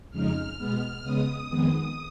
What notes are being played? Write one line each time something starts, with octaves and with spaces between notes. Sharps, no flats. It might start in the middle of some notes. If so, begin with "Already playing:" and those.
F2 C#3 G#3 D#4 F6
B2 G#3 B3 F6
C#3 G#3 B3 D#6
F2 D#3 G#3 B3